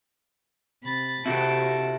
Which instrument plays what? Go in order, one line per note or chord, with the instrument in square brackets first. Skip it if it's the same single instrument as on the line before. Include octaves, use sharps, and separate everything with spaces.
[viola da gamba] C3 [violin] B5 A6
[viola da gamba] C3 [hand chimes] C4 [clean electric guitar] E4 F#4 G4 [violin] A4 D7